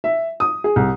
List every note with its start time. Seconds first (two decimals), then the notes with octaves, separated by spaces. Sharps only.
0.04 E5
0.40 D#6
0.64 G#4
0.76 C2